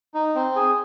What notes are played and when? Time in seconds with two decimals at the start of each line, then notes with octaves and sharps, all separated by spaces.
0.14 D#4
0.35 C4
0.56 G#4